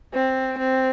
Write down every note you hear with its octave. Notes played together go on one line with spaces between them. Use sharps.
C4
C4